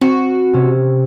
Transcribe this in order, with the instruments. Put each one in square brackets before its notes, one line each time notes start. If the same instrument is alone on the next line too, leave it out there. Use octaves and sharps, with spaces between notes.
[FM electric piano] C4 [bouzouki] F#4
[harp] C3 C#4